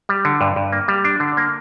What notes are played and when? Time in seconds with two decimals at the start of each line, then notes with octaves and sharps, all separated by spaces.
0.09 G3
0.25 D3
0.41 G2
0.56 G2
0.73 A#3
0.88 G3
1.05 D4
1.20 D3
1.37 A#3